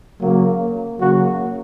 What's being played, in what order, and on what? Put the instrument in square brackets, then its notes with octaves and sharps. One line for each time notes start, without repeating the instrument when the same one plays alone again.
[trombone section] C#3 F#3 A#3
C#3 F#3 A#3 F#4